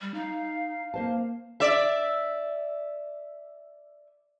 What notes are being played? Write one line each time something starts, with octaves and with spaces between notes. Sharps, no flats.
G3
D#4 F5
A#3 C5 A5
D5 E5